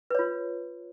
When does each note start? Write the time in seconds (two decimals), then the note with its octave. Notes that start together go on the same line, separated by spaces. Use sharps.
0.10 B4
0.15 C#5
0.19 F4